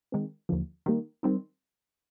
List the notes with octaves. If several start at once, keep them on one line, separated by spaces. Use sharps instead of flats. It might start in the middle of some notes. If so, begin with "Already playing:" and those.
D#3 G#3 C4
D#2 D3 F3
D#3 G3 A#3
D#3 G3 C4 D#4